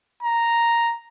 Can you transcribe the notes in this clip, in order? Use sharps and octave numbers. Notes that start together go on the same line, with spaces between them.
A#5